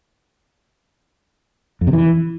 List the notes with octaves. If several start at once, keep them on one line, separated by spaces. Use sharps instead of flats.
F2
C3
E3